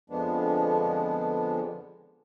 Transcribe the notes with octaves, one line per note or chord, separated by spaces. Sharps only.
F2 D3 F3 G#3 B3 D4